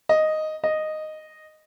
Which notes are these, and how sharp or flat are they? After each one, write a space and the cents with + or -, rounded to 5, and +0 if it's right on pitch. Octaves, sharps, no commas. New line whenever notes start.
D#5 +0
D#5 -5